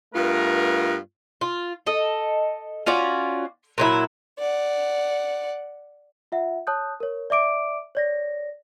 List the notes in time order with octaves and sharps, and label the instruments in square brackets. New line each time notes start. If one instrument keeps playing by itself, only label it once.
[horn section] G2 A3 B3 F4 A#4
[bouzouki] F4
A4 D#5
C#4 F4 F#4 D5
A#2 F#3 E4
[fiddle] D5 F#5
[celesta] F4 E5 F#5
C#5 A5 D#6 F#6 G6
A#4 C#5
D5 E5 D6 D7
C#5 D5 A#6